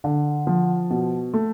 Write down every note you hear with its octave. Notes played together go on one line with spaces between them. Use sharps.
D3
F3
B2
A3